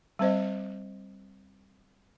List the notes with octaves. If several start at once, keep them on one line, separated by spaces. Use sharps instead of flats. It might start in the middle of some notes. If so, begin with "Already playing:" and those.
G3 C4 C5 D#5